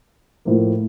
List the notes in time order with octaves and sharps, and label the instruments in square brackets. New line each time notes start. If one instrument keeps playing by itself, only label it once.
[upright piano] A2 F3 A#3